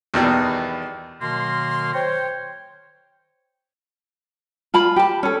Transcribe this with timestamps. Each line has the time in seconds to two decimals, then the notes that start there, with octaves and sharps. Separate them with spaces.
0.14 E2 B2 D#3 G3
1.22 B2 D#3 F#3 A#3 C6
1.94 C5 C#5 G5
4.74 F4 A5 B5
4.96 G4 A5
5.23 C#4 A4